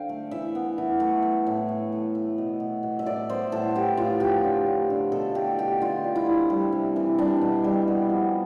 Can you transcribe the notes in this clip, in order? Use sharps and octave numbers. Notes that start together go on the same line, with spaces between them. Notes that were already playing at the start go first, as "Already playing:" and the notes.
Already playing: D3 C5 F5 G5
A3
E3 E5
B3
E3
A3
A3
A2
A3
A3
A3
B2
B2
B2
E5
A2 D5
B3 C5
A2 A4
B3 G4
A2 F4
F3 G4
D3
A3
D3
B2 A4
A3 G4
B2 G4
D3 F4
D3
E4
F3
G3
C3
E3
G3 D4
B2
G3
B3
F3